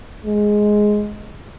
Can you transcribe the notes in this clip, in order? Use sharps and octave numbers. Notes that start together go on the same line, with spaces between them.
G#3